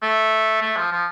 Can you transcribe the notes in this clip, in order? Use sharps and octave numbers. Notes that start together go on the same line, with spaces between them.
A3
A3
F3
F3